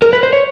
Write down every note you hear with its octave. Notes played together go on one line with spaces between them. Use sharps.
A#4
B4
C5
C#5